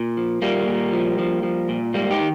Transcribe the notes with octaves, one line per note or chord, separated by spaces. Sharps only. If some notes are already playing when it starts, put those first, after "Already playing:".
Already playing: A#2
F3
A#2 G3 A#3
A#2
F3
F3
F3
A#2
G#2 G3 A#3
D#4 G4
D#3